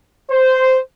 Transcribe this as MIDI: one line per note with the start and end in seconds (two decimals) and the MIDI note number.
0.31 0.78 72